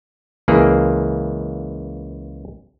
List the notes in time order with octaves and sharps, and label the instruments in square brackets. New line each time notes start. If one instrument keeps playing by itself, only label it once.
[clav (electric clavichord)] C#2 E3 A#3 G#4